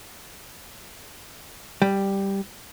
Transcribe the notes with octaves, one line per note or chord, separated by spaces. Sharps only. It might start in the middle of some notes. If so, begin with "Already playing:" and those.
G3